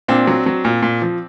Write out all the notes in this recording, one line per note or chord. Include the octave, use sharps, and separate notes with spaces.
A#2 C4 D4
F#3
F#3
A#2
A#2
F3